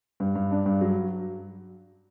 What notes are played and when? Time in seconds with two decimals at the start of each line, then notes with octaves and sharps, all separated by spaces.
0.20 G2
0.35 G2
0.51 D4
0.66 G2
0.81 F#3